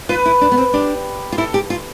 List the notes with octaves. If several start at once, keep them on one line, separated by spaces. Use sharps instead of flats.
F4 B4
E4
D4
B3
C4
D4 G4
F4
E4 A4
G4
F4